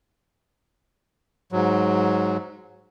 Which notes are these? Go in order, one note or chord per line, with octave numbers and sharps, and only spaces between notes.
G#2 F#3